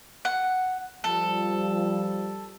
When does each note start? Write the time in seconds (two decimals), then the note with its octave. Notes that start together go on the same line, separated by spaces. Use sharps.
0.25 F#5
1.04 F3 G3 A4